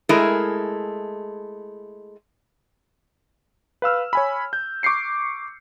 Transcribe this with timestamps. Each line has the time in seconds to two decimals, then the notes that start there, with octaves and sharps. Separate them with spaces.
0.09 G#3 A3 E4 G#4 A#4
3.82 B4 F5 E6 F6
4.13 C#5 G#5 B5
4.53 G6
4.83 C#6 D6 G6 C7 C#7